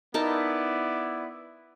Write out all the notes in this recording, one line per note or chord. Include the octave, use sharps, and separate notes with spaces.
B3 D#4 E4 A#4 D5 A5